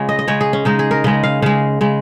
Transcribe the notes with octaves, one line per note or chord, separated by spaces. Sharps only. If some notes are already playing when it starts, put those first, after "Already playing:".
Already playing: C#3 G#3 F4 G#4 C#5
D#5
D#5
C#3 G#3 C#5
G#4
C#4
C#3 G#3 D#4
G#4
A#4
C#3 G#3 D#5
F5
C#3 G#3 F5
C#3 G#3